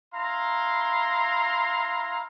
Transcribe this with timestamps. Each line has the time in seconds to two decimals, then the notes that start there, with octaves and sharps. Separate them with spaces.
0.14 E4 F5 A#5 C6